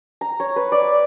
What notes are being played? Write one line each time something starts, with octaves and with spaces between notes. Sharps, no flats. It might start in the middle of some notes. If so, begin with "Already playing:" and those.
A#5
C#5
B4
D5